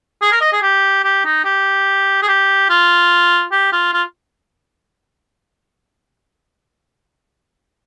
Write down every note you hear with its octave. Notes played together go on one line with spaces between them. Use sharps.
G#4
A#4
D#5
G#4
G4
G4
D#4
G4
G#4
G4
F4
G4
F4
F4